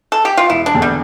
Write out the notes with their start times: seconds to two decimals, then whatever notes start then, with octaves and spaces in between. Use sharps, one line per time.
0.12 A4
0.25 G4
0.37 F4
0.50 E1 E4
0.66 D4
0.74 E2 D3 A3
0.82 G3